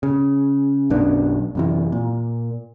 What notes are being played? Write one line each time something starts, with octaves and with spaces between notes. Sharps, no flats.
C#3
B1 F#2 B3 D4
F#2 C3 E3
A#2